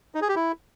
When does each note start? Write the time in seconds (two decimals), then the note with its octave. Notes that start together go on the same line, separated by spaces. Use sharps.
0.15 D#4
0.22 G#4
0.29 G4
0.36 E4